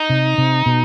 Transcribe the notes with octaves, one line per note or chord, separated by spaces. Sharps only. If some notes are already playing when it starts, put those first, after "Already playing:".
Already playing: D#4
C3
C3
B2